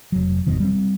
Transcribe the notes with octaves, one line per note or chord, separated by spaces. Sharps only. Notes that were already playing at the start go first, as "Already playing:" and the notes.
F1 F#3
G#1 F2 B2 D#3
G3 A3 C4